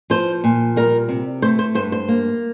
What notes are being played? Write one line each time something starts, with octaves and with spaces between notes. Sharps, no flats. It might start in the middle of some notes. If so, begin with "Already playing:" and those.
F3 C5
A#2
G3 A#4
C3
A3 C5
C5
G2 C5
C5
A#3